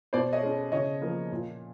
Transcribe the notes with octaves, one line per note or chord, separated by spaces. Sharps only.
B2 C5 D5
C#5 D#5
G#3 C#4
C#3 C#5 D#5
F3 A#3
A#2